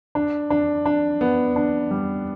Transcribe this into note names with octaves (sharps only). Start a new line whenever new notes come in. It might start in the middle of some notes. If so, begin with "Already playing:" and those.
D4
D4
D4
B3
D4
G3